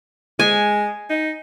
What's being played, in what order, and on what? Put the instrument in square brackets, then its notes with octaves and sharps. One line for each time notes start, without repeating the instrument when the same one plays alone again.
[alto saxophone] G#3 [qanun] G#5
[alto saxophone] D#4